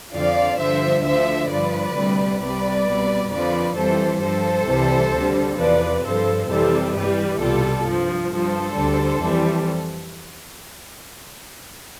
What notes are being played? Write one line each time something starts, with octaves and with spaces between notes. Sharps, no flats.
F2 D3 F3 D5 F5
G2 D3 F3 C5 E5
D2 D3 F3 C5 E5
G2 F3 B4 D5
D2 C3 G3
C2 C3 G3 B4 D5
C2 B2 G3
F2 D3 F3 B4 D5
F2 E3 G3 A4 C5
G2 F3 A4 C5
C2 C3 E3 G3
D2 D3 G3
E2 C3 F3 B4 D5
G2 F3 A4 C5
F2 C3 E3 G3 A4 C5
G2 E3 G3 G4 B4
C2 B2 G3 F4 A4
G2 F3
G2 F3 A4 C5
D2 D3 G3
F2 E3 G3